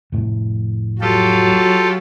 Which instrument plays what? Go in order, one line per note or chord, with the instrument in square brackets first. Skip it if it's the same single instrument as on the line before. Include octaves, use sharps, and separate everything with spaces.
[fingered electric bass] F1 A2
[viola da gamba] F#3 [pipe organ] F4 G4 A4